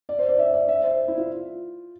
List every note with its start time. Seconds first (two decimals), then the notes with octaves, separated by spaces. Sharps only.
0.09 D5
0.19 C5
0.29 D5
0.39 E5
0.54 D5
0.68 E5
0.83 C5
1.08 E4
1.18 F4